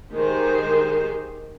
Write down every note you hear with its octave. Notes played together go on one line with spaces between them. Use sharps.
D#3 G#3 D#4 G4 C5